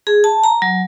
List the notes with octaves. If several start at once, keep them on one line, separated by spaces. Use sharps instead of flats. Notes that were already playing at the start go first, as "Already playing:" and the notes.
G#4
A5
A#5
F#3